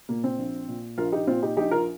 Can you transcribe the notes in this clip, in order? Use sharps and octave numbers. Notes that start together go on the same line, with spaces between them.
A#2 A#3
C4
A#1
A#2
A#1 F4 A#4
D#4 G4
A#2 C4 F4
D#4 G4
A#1 D#4 G4
F4 A#4